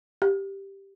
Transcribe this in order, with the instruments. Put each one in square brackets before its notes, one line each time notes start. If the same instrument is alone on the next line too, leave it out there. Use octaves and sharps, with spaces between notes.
[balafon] G4